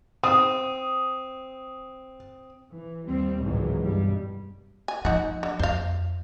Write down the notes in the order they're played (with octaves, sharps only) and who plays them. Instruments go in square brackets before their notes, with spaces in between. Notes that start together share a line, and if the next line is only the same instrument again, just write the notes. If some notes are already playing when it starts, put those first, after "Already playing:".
[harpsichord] C4 [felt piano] D#6
[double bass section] E3
D#2 G3 C4
G#1 C#2 A2 E3 F#3
G2 B2 G3
[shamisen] G#5
[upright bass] F3 [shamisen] D#4 F#5
[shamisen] D3
[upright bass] F2 [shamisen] C5 F5